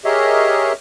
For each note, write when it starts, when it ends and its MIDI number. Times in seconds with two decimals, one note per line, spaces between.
0.05 0.72 67
0.05 0.72 68
0.05 0.72 70
0.05 0.72 73
0.05 0.72 75
0.05 0.72 76